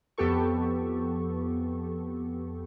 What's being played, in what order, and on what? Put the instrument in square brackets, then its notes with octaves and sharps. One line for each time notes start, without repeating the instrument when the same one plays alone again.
[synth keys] F2 B3 G4 A4 C#6